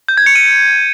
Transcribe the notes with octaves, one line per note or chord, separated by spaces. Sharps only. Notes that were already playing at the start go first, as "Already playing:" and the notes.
G6
G#6
C#7
D#7